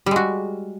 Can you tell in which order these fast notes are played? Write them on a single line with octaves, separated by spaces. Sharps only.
G3 G#3 F#4